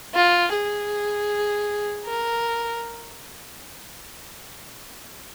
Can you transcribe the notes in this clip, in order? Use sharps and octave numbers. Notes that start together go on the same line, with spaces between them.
F4
G#4
A#4